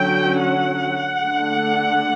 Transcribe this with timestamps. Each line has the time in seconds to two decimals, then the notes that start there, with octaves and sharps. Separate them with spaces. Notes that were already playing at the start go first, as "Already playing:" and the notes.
Already playing: D3 F#3 C#4 G5
0.42 F#5
1.22 D3 A3 D4